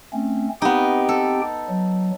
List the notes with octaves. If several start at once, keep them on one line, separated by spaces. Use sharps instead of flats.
A3 C4 C#4
B3 C4 D#4 G4 G5
A4
F#3